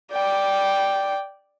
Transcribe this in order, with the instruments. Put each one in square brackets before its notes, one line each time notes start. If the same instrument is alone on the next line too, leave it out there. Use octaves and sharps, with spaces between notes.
[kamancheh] D5 G5